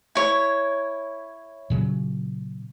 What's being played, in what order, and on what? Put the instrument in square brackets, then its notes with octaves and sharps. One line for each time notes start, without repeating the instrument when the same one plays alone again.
[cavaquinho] E4 C#5
[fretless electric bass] A#2 C#3 F#3